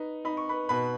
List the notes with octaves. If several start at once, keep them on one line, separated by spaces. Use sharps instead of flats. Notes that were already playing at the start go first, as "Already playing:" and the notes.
Already playing: D#4 B4
D#4 B5
C#6
B4 B5
B2 B4 B5